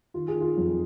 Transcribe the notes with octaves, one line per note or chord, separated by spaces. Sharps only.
D#3 F4
G#4
D#3
F4
F2